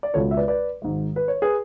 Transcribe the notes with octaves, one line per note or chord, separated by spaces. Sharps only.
D5
C#2 B2 G#3 A4 C#5
E5
B4 D5
B4 D5
G#1 G#2 G#3
B4
C#5
G#4 B4